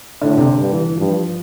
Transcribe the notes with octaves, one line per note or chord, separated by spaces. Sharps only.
A2 D3
C3
D3
G2
E3
G2 F3